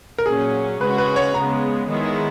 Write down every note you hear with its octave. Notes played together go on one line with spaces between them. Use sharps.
A#4
A#2 F#3 C#4 G#4
C#3 G#3 C#4 F#4 B4
B4
C#5
C#3 G#3 B3 A#5
D#3 G#3 B3 E4